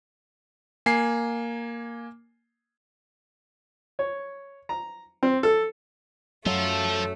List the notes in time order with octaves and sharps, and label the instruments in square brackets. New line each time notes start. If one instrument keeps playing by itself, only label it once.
[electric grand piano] A#3 G#5 C7
[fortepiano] C#5
A#5
C4
A4
[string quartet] F#2 A3 [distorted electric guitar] F3 [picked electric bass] F#3 [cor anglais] A4